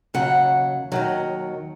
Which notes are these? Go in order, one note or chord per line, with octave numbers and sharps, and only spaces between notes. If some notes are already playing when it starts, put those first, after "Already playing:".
D#2 C#3 F#3 F#5
D#2 D#3 F#3